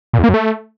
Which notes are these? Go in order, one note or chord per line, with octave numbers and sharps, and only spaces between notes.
A#2
E2
A#3
F#2
A3